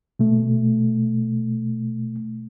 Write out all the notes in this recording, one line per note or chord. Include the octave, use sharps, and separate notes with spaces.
B2 A3